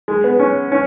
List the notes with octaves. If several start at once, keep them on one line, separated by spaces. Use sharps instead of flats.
G#3
B3
C#4
C#4